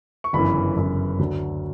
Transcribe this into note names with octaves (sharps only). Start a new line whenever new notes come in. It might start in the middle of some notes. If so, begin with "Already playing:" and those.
C#6
G1 F#2 C#3 E3 B5
G1 F#2 C#3 E3
D2 D3 F#3